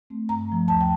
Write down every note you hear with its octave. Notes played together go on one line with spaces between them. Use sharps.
A3 C4
G2 A#5
F3 A3
D#2 A5
G5